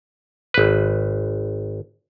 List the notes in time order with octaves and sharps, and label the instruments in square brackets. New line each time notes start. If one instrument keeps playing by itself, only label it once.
[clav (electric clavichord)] G#1 B4